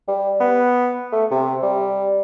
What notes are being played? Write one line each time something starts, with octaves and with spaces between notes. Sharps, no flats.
G3
B3
A3
C3
G3